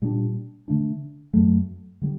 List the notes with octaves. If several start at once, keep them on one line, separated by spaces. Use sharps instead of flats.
A#2 G3 D4
D3 A3 D4
F#2 F#3 A3
D3 G3